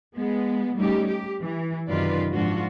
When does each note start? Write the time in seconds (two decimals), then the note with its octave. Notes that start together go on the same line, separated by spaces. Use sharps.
0.17 G#3 B3
0.77 G3 A3 C#4 D#4 G4
1.07 G4
1.42 E3
1.89 F#2 C3 D#3 F4 B4 D5
2.33 G#2 F3 D4 F4 F#4